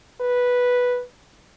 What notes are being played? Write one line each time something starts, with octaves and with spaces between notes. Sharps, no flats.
B4